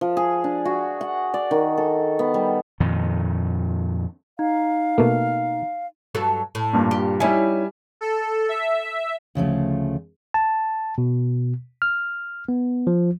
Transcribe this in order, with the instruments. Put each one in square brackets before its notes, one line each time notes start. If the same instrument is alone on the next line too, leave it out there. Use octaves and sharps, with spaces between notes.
[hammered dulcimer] F3
G#4
D4
F#4
F#5
D5
D#3
A4
B3
G3
[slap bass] F2 A#2 D#3
[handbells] D#4 [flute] F5
[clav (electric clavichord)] B2 A3 A#3
[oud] G2 F#3 A4
A2
[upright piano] G2 A#2
[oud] G4
[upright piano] G3 E5 G#5 [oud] C#4 D#4 E4
[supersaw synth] A4
E5
[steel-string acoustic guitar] D2 C#3 F3 A3
[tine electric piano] A5
B2
F6
B3
F3